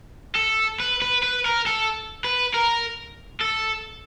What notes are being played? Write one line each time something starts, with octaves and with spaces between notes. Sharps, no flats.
A4
B4
B4
B4
A#4
A4
B4
A#4
A4